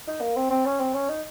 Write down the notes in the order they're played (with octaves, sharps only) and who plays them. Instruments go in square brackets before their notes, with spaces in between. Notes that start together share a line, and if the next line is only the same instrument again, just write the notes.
[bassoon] D#4
A#3
C4
C4
C#4
C4
C#4
D#4